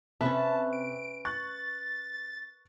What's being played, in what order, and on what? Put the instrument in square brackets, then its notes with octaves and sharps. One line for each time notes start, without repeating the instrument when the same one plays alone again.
[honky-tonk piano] C3 [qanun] C#4 A4 E5 [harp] B4 [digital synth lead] A5
[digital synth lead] D7
[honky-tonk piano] C#6 F#6 [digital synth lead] A6